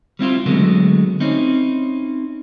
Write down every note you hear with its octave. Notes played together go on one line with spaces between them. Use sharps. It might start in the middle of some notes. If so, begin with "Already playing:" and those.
G3 C4 E4 F4
D3 F#3 G#3 A3 B3
C4 C#4 D#4 E4